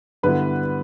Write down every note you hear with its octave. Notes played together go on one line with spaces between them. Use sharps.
G2 D3 G3 B3 E4 B4